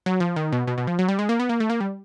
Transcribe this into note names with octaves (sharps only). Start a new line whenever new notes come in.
F#3
F3
D#3
B2
B2
B2
F3
F#3
G3
G#3
A#3
B3
A#3
A3
A#3
G3